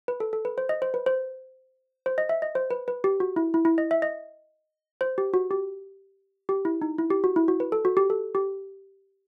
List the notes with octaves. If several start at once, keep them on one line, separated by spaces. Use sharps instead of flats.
B4
A4
A4
B4
C5
D#5
C5
B4
C5
C5
D#5
E5
D#5
C5
B4
B4
G4
F#4
E4
E4
E4
D#5
E5
D#5
C5
G4
F#4
G4
G4
E4
D#4
E4
G4
F#4
E4
F#4
B4
A4
F#4
G4
A4
G4